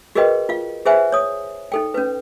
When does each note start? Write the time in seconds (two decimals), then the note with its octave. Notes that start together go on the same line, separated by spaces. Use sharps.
0.15 F#4 G#4 A#4 B4 D#5 G5
0.49 F4 F5
0.86 G#4 B4 C5 E5 F#5 G#5
1.12 C#5 D#6
1.72 D#4 A4 G5
1.94 C#4 B4